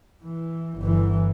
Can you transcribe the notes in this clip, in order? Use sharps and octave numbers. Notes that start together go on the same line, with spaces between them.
E3
G1 E3